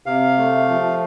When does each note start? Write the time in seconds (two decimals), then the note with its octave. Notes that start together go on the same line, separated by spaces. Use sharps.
0.06 C3 F5
0.38 A3
0.69 F3